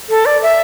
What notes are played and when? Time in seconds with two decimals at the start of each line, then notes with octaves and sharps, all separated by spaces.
0.09 A4
0.26 D5
0.42 E5